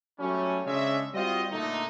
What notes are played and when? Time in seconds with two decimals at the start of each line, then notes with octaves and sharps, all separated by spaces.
0.19 F#3 G3 A3 C#4
0.65 C#3 G#3 D4 G#4 C#5 E5
1.14 G3 C4 F4 F#4 D#5
1.51 A#2 D3 A3 D#4